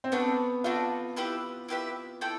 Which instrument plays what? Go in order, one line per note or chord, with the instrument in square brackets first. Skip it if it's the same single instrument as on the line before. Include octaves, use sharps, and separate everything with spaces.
[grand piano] C4
[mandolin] A3 D4 F#4 [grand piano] B3
[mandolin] A3 D4 F#4 [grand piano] F4
[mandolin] E4 G4 B4 E5
E4 G4 B4 E5
E4 A4 D5 G5